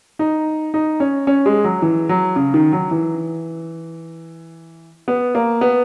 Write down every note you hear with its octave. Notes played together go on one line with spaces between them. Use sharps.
D#4
D#4
C#4
C#4
G#3
F#3
E3
F#3
C#3
D#3
F#3
E3
B3
A#3
B3